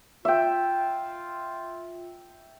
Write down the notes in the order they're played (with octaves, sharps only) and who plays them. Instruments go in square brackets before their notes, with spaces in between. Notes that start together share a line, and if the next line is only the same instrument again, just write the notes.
[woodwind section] F4 [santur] E5 G5